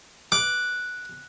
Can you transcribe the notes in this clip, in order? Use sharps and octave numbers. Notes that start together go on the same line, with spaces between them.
D6 F#6